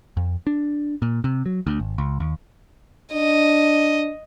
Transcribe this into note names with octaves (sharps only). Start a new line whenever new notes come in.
F2
D4
A#2
C3
F#3
D2
G#1
C#2
D#2
D4 D#5